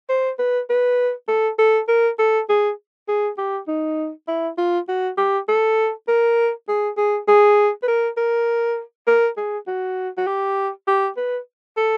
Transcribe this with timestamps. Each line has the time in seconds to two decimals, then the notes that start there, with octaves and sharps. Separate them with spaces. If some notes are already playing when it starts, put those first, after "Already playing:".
0.09 C5
0.39 B4
0.69 B4
1.28 A4
1.59 A4
1.88 A#4
2.19 A4
2.49 G#4
3.08 G#4
3.38 G4
3.68 D#4
4.28 E4
4.58 F4
4.88 F#4
5.17 G4
5.48 A4
6.08 A#4
6.68 G#4
6.97 G#4
7.28 G#4
7.83 B4
7.88 A#4
8.17 A#4
9.07 A#4
9.37 G#4
9.67 F#4
10.17 F#4
10.27 G4
10.87 G4
11.17 B4
11.77 A4